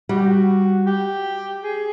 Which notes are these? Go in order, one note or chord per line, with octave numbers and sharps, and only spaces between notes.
G3 F#4
G4
F#4
G4
G#4